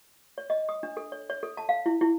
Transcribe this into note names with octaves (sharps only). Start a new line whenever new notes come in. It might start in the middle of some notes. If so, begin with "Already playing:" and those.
C#5
D#5
D#6
D4
A4
C#5
C#5
A4
A5
F5
E4
E4